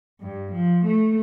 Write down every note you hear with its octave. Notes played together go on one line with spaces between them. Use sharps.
G2
F3
A3